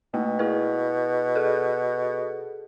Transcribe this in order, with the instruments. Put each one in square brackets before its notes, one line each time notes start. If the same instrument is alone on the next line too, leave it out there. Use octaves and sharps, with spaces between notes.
[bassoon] B2 [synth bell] A3 A#3
[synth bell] E4 G#4 B4
G#4 A4